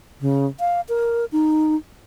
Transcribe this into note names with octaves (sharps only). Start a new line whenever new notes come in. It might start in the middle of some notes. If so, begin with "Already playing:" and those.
C#3
F5
A#4
D#4